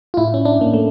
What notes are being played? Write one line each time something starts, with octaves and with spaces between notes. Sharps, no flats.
F4
A2 E4
C#4
D4
A2 A#3
A3